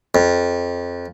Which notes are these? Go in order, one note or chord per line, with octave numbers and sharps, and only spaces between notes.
F2